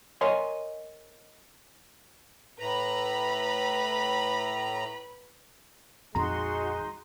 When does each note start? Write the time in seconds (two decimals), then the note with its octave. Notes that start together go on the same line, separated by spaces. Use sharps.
0.21 A#4 C#5 D#5 G#5 C6
2.59 A2 B4 A#5 B5
6.15 A#1 F2 D#3 G#3 D#4 F#4 A#5 C6